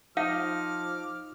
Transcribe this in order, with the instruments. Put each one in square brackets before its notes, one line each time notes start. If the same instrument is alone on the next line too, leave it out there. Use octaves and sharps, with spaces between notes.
[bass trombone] F3 [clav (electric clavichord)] D#4 [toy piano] F5 [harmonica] D6 F6